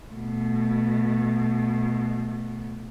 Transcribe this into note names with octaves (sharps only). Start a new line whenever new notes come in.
B2 A3